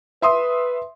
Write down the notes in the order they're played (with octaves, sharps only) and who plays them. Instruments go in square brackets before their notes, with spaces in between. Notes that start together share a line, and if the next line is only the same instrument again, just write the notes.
[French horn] B4 [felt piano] E5 C6 D#6